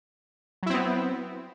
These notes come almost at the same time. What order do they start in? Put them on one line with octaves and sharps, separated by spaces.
F#3 E4 C4 B3